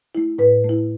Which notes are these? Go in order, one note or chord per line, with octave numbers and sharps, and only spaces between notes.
A3 E4
A2 B4
A3 E4